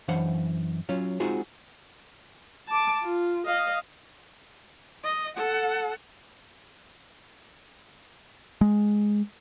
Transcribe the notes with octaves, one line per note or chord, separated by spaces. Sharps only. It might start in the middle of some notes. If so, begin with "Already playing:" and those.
F#2 E3 D4 C5 F5 F#5
F#3 C#4 F4
G#3 C4 D#4 F4 F#4 G#4
A5 D6
F4
D#5 F5
D#5
A4 F#5
G#3